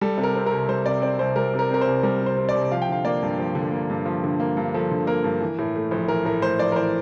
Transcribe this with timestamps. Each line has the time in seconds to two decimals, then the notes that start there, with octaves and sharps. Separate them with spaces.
0.01 G3 A4
0.18 C3
0.23 A#4
0.35 C4
0.46 A#4
0.52 C2
0.69 G3 C5
0.86 C3 D5
1.02 C4 D5
1.19 C2 C5
1.36 G3 A#4
1.53 C3
1.59 A#4
1.70 C4 A#4
1.81 C5
1.87 C2
2.03 G3 A#4
2.21 C3
2.26 C5
2.37 C4
2.49 D5
2.55 C2
2.71 F3 F5
2.82 G5
2.89 D3 F5
3.05 A#3 D5
3.22 G2
3.39 F3
3.55 D3
3.72 A#3
3.90 G2
4.06 F3
4.24 D3
4.40 A#3
4.57 G2
4.74 F3 A4
4.91 D3
5.07 A#3 A#4
5.24 G2
5.41 E3
5.59 A2
5.76 A3
5.91 A#1
6.08 E3 A#4
6.25 A2 A#4
6.42 A3 C5
6.59 A#1 D5
6.72 A#4
6.76 E3 C5